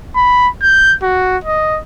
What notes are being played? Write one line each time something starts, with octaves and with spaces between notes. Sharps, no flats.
B5
G6
F#4
D#5